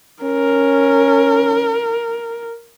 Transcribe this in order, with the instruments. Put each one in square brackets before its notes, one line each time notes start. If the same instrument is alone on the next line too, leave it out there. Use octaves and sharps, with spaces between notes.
[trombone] C#4 [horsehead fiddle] A#4